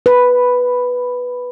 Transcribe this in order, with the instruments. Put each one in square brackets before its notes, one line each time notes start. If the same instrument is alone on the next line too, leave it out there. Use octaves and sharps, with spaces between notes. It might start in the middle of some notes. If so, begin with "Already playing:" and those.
[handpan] B4